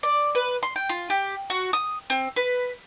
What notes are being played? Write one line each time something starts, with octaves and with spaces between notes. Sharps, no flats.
D5
B4
C6
G5
F4
G4
F#4
D#6
C4
B4